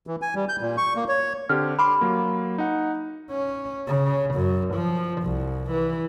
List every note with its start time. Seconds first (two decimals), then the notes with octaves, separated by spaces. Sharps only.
0.07 E3
0.22 G#5
0.35 G3
0.49 G6
0.61 A#2
0.77 C#6
0.96 A#3
1.09 C#5
1.49 D3 C4 G4 F6
1.79 B5 C6 D6 F6
2.01 F#3 A#3
2.58 D#4 F#5
3.31 C#4
3.87 C#3
4.35 F#2
4.74 F3
5.22 C2
5.71 E3